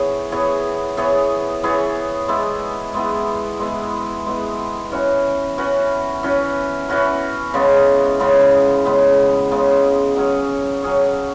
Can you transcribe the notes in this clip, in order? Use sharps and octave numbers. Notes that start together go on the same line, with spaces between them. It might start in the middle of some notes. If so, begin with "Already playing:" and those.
Already playing: E3 B3 G#4 C#5
E3 B3 G#4 C#5
E3 B3 G#4 C#5
E3 B3 G#4 C#5
G#3 B3 E4
G#3 B3 E4
G#3 B3 E4
G#3 B3 E4
E3 C#4 F#4 B4
E3 C#4 F#4 B4
E3 C#4 F#4 B4
E3 C#4 F#4 B4
C#3 G#3 B3
C#3 G#3 B3
C#3 G#3 B3
C#3 G#3 B3
F#3 C#4 G#4 C#5
F#3 C#4 G#4 C#5